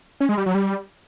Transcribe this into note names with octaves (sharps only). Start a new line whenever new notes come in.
C#4
G#3
G3
F#3
G3